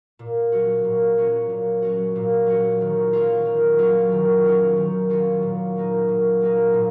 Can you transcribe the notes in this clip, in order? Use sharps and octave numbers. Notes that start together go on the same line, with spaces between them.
A#2
F#3 C#4 F#4
A#2
F#3 C#4 F#4
A#2
F#3 C#4 F#4
A#2
F#3 C#4 F#4
D#3
F#3 C#4 F4
D#3
F#3 C#4 F4
D#3
F#3 C#4 F4
D#3
F#3 C#4 F4
A#2
F#3 A#3 D#4
A#2
F#3 A#3 D#4
A#2